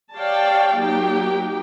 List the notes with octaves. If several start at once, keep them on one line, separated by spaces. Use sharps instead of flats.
G4 C#5 D5 F5 G5 A5
F#3 A#3 D#4 G4 G5